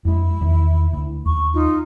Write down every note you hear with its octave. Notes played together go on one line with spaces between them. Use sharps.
F2 G#3 E4
E2 D#3
D2
D#2 C#6
D#4 F4